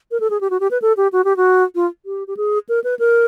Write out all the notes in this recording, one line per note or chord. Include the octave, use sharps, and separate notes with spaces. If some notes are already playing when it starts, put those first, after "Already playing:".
A#4
A4
G#4
G4
F#4
G4
B4
A4
G4
F#4
G4
F#4
F4
G4
G4
G#4
A#4
B4
A#4